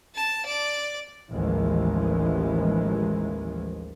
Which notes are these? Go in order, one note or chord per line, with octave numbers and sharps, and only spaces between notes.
A5
D5
A1 D#2 E3 F3 G#3